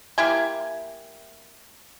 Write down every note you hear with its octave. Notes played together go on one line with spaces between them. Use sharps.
A#3 E4 G4 G#5